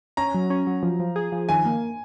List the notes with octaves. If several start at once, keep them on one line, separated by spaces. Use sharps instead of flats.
C#4 A#5
F#3
C#4
F#3
F3
F3
G#4
F3
D#3 G#5
A#3